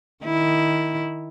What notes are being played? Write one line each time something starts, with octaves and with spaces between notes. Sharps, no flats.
D#3 E4